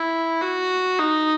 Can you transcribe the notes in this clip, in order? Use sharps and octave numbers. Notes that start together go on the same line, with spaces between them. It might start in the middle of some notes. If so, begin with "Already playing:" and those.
Already playing: E4
F#4
D#4